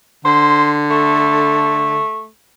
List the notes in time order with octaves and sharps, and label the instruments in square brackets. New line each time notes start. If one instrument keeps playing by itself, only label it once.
[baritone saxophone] D3 [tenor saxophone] C5
[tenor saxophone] A3